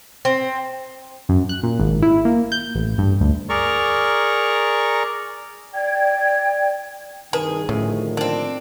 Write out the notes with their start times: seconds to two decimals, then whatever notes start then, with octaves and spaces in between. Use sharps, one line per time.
0.25 C4
1.29 F#2
1.49 F#6
1.63 A#2
1.79 G#1
2.02 E4
2.25 A#3
2.52 G6
2.75 A1
2.98 G2
3.20 D2
3.49 G#4 A#4 D5 A#5 C#6
5.74 D5 G5 G#6
7.33 C2 G2 D#3 G#4 A#4 B4 A5
7.69 A2 D3 D#3 F3 C#4
8.17 A#3 C4 D4